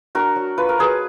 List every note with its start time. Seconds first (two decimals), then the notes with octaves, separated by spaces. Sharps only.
0.15 D4 F#4 A#4
0.36 F#3
0.58 F4 B4
0.69 A#4
0.79 F#3 G#4 B4